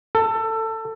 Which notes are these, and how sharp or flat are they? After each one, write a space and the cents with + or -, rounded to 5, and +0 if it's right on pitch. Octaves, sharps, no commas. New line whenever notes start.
A4 +20